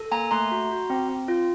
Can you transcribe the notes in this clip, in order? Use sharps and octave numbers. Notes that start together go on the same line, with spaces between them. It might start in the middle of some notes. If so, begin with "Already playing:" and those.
Already playing: A4
A#3 G#5 A#5
A3 A#5 C6
F#4
F#4
C4
C4
F4